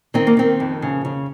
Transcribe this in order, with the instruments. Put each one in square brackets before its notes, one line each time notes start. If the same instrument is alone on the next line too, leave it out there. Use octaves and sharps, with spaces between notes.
[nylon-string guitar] D#3 C4
A#3
D#3 C4
F2
C#3
C#3